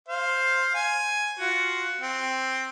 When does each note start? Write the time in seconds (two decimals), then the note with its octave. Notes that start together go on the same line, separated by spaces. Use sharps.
0.08 C5 F5
0.75 G#5
1.39 F4 F#4
2.01 C4